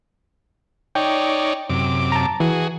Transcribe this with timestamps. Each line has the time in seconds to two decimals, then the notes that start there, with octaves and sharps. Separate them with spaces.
0.95 D#4 C#5 D5 G5
1.70 F#2 C3 D6
2.12 A5 A#5
2.40 E3 F#4 G#4